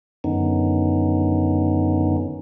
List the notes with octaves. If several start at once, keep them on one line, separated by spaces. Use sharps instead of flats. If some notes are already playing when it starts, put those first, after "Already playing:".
F#2 D3 D#3 B3 C#4 D#4